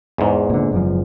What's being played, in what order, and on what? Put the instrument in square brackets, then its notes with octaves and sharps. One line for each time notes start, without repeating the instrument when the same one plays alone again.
[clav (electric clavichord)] E2 G#2
[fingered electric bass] A#2 D3
F#1 F#2 F3